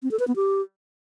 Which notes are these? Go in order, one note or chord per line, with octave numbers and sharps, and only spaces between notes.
C4
A4
B4
B3
G4